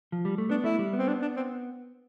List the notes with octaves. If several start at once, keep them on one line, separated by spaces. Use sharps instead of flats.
F3
G3
A3
B3 D4
A3 E4
G3
B3
C4
D4
D4
C4